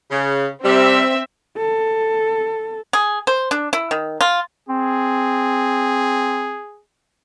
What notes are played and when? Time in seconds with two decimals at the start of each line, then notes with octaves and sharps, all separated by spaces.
0.10 C#3
0.63 C3 G3 C4 E5
1.58 A4
2.93 G#4
3.27 C5
3.51 D4
3.73 E4
3.91 D#3
4.21 F4
4.69 C4 G#4